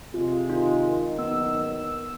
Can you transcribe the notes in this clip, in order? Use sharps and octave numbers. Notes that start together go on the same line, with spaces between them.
C3 F3 G#3 F4
D#3 D#4 F4
F#1 B1 B3 E6